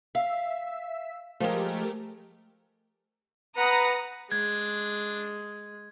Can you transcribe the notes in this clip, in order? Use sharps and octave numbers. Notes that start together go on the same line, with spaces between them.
E5 F5
F3 G#3 A3 G4 A#4
B4 F#5 A#5 D#6
G#3 D4 G#6